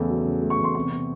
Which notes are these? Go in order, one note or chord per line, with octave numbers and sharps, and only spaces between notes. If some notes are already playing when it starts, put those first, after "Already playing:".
Already playing: E2 C#3 A3
F#3
C#3
A3
C#6
E2
C6
C3 C#6
C3